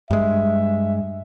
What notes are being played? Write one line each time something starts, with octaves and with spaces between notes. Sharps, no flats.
G2 G#3 E5